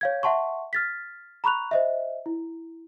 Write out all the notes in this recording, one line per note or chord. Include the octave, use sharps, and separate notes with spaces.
C#5 F5 G#6
E5 F#5 A5 C6 C#6
F6 A6 B6
A#5 B5 C#6 F#6 F7
C5 D#5 E5
E4